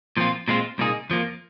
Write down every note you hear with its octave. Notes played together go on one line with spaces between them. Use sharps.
A#2 F3 C4 F4
A#2 G#3 C4 F4
C2 A#2 A#3 D#4 G#4
F2 F3 A#3